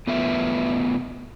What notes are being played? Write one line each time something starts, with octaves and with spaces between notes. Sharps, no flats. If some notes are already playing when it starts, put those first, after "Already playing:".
B2 A3 B3 F4 B4 E5